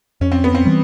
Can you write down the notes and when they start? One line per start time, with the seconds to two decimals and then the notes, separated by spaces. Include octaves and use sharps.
0.21 F2 C#4
0.32 C4
0.44 B3
0.55 C4
0.65 E3 G3